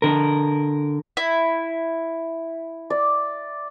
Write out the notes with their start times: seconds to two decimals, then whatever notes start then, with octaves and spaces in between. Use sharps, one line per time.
0.02 D3 A#4
1.17 E4
2.90 D5